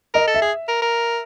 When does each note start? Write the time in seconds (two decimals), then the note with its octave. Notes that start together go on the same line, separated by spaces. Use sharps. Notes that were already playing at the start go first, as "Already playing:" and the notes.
0.14 A#4 D#5
0.28 A4
0.35 E5
0.42 G#4
0.68 A#4
0.82 A#4